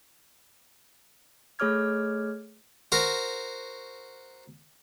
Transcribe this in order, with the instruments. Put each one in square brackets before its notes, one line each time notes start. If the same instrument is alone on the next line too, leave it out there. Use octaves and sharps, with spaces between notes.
[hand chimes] A3 G#4 C#5 D6 F6 G#6
[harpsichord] F#4 A#4 C5